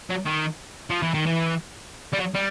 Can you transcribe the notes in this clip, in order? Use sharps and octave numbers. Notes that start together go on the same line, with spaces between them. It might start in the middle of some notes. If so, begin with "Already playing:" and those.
F#3
D#3
F3
E3
D#3
E3
G3
F#3
G3